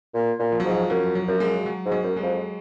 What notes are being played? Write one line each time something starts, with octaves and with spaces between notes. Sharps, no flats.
A#2
A#2
F3
F#3
G#2 F3
F#2 F#3
F#3
F#2
G#3
F#3
G#2
F#3
F#2
G#3
F2